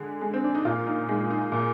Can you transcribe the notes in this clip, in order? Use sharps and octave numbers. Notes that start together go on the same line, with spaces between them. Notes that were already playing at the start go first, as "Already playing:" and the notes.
Already playing: D3 G#3
G#3
C4
D4
D#4
A#2 F4
D#4
G#3 D#4
D#4
A#2